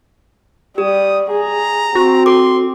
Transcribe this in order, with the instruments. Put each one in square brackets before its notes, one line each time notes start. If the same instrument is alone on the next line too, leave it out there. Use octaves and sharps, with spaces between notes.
[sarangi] G3 [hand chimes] G4 [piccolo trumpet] D#6
[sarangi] G#4 [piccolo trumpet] A#5
[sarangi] C4 [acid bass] F#4
[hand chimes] A4 D6 [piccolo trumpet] C6